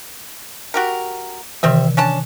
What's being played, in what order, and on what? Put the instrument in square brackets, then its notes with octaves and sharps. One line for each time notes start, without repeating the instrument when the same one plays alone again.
[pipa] F#4 G4 A#4
[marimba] C3 D#3 E3 [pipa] G3 C4 E5
[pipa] C#4 D4 A5